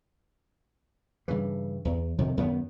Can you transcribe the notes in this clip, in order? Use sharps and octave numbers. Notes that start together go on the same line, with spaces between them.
G2 C#3 E3
E2
F2 C3 D#3
F#2 D#3 B3